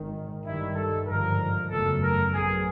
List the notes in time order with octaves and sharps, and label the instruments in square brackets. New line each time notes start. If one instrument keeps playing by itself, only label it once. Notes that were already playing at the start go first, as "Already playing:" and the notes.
Already playing: [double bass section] G#1 G#2 D#3
[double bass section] G2 D#3 G3 [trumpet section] E4
[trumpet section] A4
[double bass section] G#1 G2 D3 F3 [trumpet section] A#4
[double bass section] F#1 E2 C#3 F#3 A3 [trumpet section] A4
[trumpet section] A#4
[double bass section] A1 A2 F#3 B3 [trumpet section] G#4